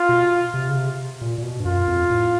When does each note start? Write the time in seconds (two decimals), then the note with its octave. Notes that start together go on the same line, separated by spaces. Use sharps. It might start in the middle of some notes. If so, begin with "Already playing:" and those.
Already playing: F4
0.09 B2
0.54 C3
0.69 C#3
0.76 C3
1.21 A#2
1.38 A#2
1.43 B2
1.60 G2
1.65 F#2 F4
1.88 F2
2.10 A2